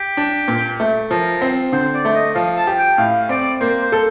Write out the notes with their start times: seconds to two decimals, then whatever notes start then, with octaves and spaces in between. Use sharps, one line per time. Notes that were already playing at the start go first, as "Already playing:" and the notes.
Already playing: G4
0.17 D4
0.48 A#2
0.80 A3
1.11 F3 A#4
1.42 C4
1.72 D3 C5
1.94 D5
2.05 A3
2.15 D#5
2.35 F3 F5
2.56 A5
2.67 G4
2.78 G5
2.98 A2 F5
3.29 C4 D5
3.60 A#3 C5
3.81 C5
3.92 A4